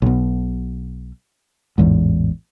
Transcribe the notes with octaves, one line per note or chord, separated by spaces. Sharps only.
B1 B2
A1 E2 G#2